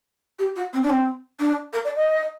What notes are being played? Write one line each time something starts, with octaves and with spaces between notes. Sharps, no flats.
G4
F#4
C4
D4
C4
D4
A#4
D5
D#5